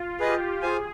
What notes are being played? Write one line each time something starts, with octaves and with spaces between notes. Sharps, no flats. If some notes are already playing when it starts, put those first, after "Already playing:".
Already playing: F4
G4 G#4 B4 D#5
F4 G#4 C5 F5 G#5